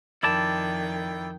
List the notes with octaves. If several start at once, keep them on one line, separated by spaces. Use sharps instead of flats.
F2 D#3 E4 D5 G5 A5